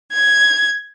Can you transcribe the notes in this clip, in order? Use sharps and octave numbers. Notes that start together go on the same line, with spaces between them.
G#6